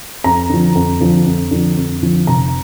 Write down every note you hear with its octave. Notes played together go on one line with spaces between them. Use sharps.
F2 A#5
D3 F3
F2
D3 F3
F2
D3 F3
F2
D3 F3
F1 A#5